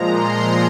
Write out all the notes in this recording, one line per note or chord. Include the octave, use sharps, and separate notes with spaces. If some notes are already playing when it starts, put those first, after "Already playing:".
Already playing: A#2 F3 G#3 A#5
C6